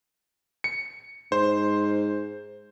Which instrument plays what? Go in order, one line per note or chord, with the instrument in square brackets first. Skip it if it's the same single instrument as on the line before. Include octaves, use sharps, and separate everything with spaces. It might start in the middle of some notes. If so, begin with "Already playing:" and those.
[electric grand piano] C#7
[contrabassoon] G#2 [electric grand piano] C5